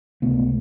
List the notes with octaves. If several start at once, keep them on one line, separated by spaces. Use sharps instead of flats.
C#2 C3 A3 B3